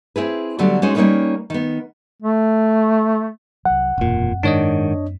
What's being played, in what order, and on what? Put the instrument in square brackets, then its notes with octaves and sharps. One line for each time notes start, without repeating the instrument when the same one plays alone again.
[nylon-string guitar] C4 E4 G#4 B4
D3 F#3 G3 A3 B3
G#3 C#4 D#4 F#4 C5
G3 A#3 C#4 D#4 A#4 B4
D#3 B3
[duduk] A3
[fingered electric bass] C2 F#3 [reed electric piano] F#5
[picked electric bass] E1 A#2 [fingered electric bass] F#2 A#3 C4
[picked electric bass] G#2 D#3 [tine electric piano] D4 C#5 D#5